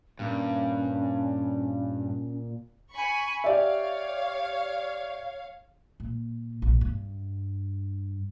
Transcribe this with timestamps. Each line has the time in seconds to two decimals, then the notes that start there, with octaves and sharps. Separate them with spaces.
0.19 G2 A#2 C#4
2.91 G#5 B5 C#6
3.44 G4 C#5 D5 E5 F5
6.00 A#2
6.62 A#1
6.81 G2